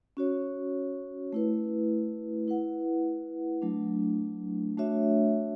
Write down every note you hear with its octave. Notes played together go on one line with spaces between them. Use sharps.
C#4 F#4 C#5
A3 E4 B4
E4 B4 F#5
F#3 A3 D4
A3 D4 F#4 C#5 E5